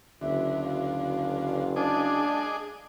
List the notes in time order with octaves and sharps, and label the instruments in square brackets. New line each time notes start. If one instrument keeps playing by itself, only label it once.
[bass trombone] F#1 [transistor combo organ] D2 [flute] E5
[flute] F5
[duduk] D4 [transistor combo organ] G#4 D#5 D6